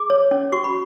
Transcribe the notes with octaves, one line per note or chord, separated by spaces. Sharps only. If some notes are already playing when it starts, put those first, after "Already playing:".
Already playing: G#4 D6
C#5
C#4
F#4 C#6
B5